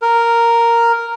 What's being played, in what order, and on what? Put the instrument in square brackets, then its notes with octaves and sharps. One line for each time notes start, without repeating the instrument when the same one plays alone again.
[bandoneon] A#4